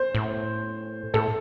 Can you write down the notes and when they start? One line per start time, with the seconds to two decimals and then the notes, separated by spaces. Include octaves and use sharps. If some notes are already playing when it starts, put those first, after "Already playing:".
Already playing: C5
0.15 A2
1.14 A2 A4